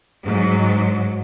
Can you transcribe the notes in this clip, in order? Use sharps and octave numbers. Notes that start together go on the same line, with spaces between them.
G#2 F#3